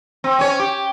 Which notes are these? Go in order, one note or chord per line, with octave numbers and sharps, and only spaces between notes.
C4
C#4 C#5
G4